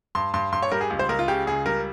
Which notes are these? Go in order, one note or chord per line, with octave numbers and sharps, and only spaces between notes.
G2 C6
G2 C6
G2 C6
C#5
G3 A#4
G#4
C#2
C5
C#2 A#4
F4
C#3 G4
C#2 G#4
G3 A#4